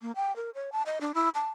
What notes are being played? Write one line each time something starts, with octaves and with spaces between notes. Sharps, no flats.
A#3
G5
A#4
C#5
A5
D#5
D4
E4
A5